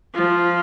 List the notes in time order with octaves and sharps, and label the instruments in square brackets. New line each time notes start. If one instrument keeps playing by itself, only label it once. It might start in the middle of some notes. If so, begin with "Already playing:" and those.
[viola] F3